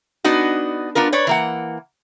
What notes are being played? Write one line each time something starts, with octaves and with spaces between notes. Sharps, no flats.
B3 D4 D#4 F#4
B3 D4 F4 A#4
B4 C#5 D5
E3 A#3 F#5